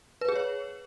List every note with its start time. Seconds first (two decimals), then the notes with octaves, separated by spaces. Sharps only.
0.21 B4
0.28 G#4
0.36 C#5